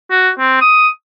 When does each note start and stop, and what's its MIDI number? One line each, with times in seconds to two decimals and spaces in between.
0.11 0.30 66
0.39 0.61 60
0.61 0.88 87